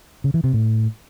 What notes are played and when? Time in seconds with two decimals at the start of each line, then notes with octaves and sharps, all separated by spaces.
0.24 C#3
0.34 E3
0.44 C3
0.54 A2